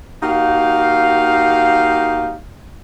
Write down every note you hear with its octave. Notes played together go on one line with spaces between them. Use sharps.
A#3 D#4 F#4 G4 F5